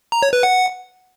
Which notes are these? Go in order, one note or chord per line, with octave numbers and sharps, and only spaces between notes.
A#5
C#5
B4
F#5